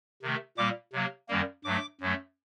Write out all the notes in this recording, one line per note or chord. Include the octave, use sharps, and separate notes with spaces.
C3 D#3 A3
A#2 G3 A#3 D6
C3 F#3 A#3
F#2 D#3 G3 A#3
G2 F#3 A3 D6
F#2 F#3 A3